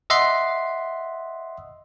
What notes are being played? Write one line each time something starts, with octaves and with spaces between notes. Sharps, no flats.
D#5 E5 F#5 C6 C7